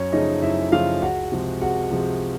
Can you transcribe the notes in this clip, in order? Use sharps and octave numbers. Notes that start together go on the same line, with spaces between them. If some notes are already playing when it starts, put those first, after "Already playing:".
Already playing: F#2 C#4 C#5
C#3 F3 A3 C#4 D#4 D#5
F#2 E4 E5
C#3 F3 A3 C#4 F4 F5
C#2 F#4 F#5
C3 F3 G#3
C#2 F#4 F#5
C3 F3 G#3